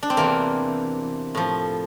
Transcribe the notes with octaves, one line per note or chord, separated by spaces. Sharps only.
D4
C4
E2 C3 E3 A#3
A2 F3